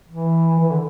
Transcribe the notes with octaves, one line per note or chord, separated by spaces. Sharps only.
E3
E3
D3